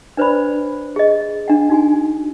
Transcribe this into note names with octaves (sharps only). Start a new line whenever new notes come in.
D4 B4 C5 D5 B5
G#4 D#5
D4 F#5
D#4 F#4 G#5